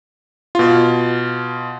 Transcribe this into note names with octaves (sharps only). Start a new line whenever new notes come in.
B2 F4